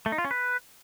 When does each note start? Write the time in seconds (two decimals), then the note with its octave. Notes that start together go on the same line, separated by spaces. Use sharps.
0.06 A3
0.12 D#4
0.18 F4
0.25 C#4
0.31 B4